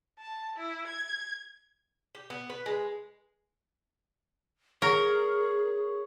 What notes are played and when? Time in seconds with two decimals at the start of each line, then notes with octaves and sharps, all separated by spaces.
0.19 A5
0.56 E4
0.87 G#6
2.15 G4
2.30 B3
2.50 B4
2.66 G#3
4.82 G#4 A#4 C#5